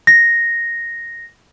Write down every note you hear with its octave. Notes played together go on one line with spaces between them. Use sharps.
A#6